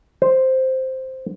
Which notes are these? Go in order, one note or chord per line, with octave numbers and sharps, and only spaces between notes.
C5